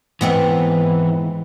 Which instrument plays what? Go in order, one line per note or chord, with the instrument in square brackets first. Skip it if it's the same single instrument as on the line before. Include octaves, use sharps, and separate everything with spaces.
[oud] G#2 B3 C4 [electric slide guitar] E3